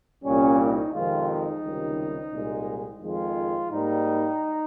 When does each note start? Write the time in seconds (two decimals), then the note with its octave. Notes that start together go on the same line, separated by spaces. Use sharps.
0.23 C2 A#2 G3 C#4
0.59 D#4
0.93 F2 C3 D#3 G#3 F4
1.29 D#4
1.63 C#2 C3 D#3 G3
2.32 C2 A#2 G#3
3.01 F2 D#3 G#3 F4
3.70 G#2 G3 A#3 D#4